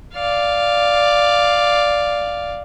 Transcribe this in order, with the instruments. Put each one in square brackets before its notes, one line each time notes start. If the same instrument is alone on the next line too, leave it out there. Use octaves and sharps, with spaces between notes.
[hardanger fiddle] D5 F5